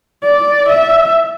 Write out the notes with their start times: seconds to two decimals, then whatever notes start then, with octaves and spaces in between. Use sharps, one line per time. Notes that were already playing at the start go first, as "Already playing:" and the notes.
0.24 D5
0.69 E5